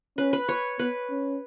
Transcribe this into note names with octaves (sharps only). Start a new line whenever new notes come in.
C#4 B4
B4
C#5
B3 B4
C#4